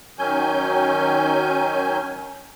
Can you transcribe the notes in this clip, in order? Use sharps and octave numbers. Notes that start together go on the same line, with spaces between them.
D#3 F#3 C#4 G#5 G6